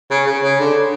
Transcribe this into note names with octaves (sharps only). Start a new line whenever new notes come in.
C#3
C#3
C#3
D3